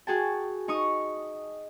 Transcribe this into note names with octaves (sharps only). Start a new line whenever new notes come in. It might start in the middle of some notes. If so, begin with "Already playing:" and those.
F#4 G#4 G5 A5
D#4 C#6 D#6